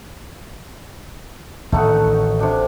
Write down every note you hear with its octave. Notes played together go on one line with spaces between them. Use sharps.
A1 D#3 A3 D#4 F#4
C3 D4